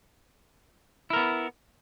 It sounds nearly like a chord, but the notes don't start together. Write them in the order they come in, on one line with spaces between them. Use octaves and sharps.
E4 A#4 B3